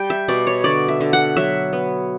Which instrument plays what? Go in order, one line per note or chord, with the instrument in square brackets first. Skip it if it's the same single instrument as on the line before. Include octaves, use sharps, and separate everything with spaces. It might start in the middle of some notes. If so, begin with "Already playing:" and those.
Already playing: [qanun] G3 G5
E5
B2 D5
C#5
D3 D5
E5
D3
F#5
F#3 E5
B3